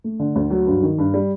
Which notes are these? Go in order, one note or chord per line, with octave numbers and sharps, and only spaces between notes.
A3
D3
D2
F#3
G2
D#3
G2
G3